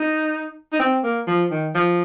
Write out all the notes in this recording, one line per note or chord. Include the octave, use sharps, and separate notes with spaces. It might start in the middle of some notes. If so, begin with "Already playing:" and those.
Already playing: D#4
D#4
C4
A#3
F3
D#3
F3